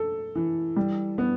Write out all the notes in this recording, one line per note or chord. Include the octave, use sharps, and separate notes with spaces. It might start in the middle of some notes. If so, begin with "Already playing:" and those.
Already playing: A4
E3
G3
B3